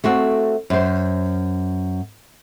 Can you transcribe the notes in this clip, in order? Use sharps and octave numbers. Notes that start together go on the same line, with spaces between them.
A3 C4 F#4
F#2 C5